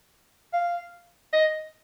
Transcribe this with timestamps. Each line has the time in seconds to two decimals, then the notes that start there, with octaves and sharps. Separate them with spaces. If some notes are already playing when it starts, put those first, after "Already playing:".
0.53 F5
1.33 D#5